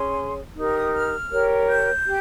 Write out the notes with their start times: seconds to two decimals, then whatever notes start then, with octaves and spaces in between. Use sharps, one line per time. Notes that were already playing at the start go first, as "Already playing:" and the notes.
Already playing: C#4 G#4 C#5 C6
0.55 D#4 G4 A#4
0.74 D#6
0.92 F6
1.31 G4 A#4 C#5
1.68 G6
2.05 G4